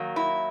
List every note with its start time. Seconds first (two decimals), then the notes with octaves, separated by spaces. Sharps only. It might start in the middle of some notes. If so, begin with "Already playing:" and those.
Already playing: D#3 F#3 A#3
0.16 E4